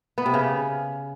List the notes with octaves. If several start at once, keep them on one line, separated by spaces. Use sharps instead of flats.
B3
C3
C#3